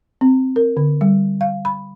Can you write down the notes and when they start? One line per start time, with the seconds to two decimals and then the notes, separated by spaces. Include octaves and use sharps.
0.21 C4
0.56 A#4
0.77 D3
1.01 G3
1.41 F5
1.65 B5